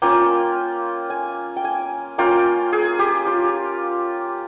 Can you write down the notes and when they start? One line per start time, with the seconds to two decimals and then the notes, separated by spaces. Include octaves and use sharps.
0.02 A#3 C#4 F4 G5
1.10 G#5
1.56 G5
1.64 G#5
2.18 A#3 C#4 F4 G5
2.72 G#4
2.99 G4
3.27 F4